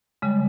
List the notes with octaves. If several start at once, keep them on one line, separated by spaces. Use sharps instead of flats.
C#3 G3 G#3